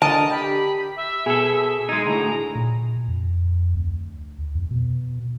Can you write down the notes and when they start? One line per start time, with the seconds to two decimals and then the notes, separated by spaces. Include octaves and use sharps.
0.02 D3 A#4 D#5 A5
0.30 G4 B5
0.96 E5
1.26 B2 G#4 A4
1.89 G#3 D#4 G#6
2.06 D2 A2 A#5
2.55 A#2
3.08 F2
3.75 D2
4.55 F2
4.71 B2